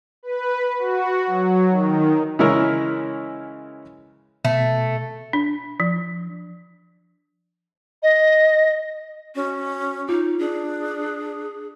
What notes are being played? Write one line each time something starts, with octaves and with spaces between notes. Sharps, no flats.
B4
F#4
F#3
D#3
C#3 E3 G#3 C#4 E4 A#4
B2 A3
D4
F3
D#5
C#4 F#4
D#4 F4
D4 G#4